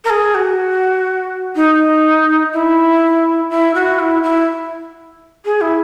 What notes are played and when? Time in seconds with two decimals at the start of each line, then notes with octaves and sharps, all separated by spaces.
0.04 A#4
0.09 G#4
0.34 F#4
1.55 D#4
2.53 E4
3.49 E4
3.74 F#4
3.99 E4
4.23 E4
5.45 G#4
5.61 E4